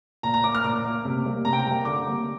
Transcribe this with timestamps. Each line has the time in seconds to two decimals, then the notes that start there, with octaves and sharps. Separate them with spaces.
0.23 A#2 A#5
0.34 A#5
0.44 A#3 D6
0.55 F6
0.64 A#2 D6
0.84 A#3
1.05 C3
1.25 G3 A#3
1.45 C3 A#5
1.53 G5
1.59 A#5
1.66 G3 A#3
1.85 D3 D6
2.07 G3 A#3